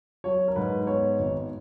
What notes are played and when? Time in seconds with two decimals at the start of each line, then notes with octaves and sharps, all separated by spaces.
0.24 F#3 C#5
0.48 A#4
0.56 G#2 B4
0.87 B3 C#5
1.19 G#1